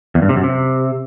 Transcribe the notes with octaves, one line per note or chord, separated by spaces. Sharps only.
E2
G2
C3
F#2
C3